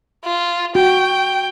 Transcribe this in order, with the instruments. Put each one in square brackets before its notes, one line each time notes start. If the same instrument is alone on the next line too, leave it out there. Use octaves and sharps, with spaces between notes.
[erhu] F4
[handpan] F#4 [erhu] G5